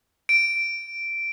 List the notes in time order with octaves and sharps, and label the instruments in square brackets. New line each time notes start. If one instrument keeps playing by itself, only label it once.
[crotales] D7